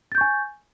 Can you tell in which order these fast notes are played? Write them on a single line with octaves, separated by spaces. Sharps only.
A6 G6 C#6 G#5